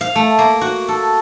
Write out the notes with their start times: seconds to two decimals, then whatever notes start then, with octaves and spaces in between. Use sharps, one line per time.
0.01 F5
0.15 A3
0.39 A#3
0.61 F#4
0.88 A4